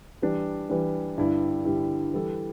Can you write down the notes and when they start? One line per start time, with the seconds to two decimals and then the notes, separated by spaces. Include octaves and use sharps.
0.22 E3 G3 D4
0.69 E3 G3 D4
1.18 G2 D3 G3 E4
1.65 G2 D3 G3 E4
2.13 E3 G3 E4 A4